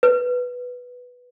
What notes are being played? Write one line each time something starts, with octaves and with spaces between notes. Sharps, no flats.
B4